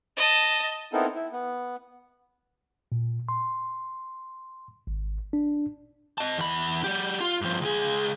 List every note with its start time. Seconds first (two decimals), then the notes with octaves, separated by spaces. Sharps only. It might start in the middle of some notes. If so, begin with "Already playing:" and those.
0.17 D#5 A5
0.93 B3 C4 D#4 E4 A4 A#4
1.15 E4
1.32 B3
2.92 A#2
3.29 C6
4.87 G#1
5.33 D4
6.18 D#5 A5
6.38 E2 B5
6.84 F#3 G4
7.21 F4
7.41 G2 F3
7.61 C#2 G#4